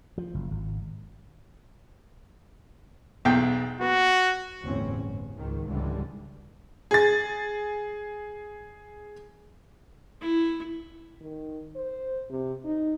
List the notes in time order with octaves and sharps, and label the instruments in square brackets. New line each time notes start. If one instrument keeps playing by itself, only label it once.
[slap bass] F3
F#1
G#1
[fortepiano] B1 E2 G5
[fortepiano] B3 [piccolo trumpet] F#4
[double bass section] G1 E2 A2 C4 C#4
G1
C#2 G#2 D#3
C#2 G#2 D3 E3 G3 G#3
[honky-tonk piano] G#4 A6
[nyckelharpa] E4
[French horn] D#3
C5
C3
D#4